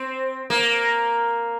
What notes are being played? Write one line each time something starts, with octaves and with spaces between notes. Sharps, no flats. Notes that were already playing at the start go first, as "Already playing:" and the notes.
Already playing: C4
A#3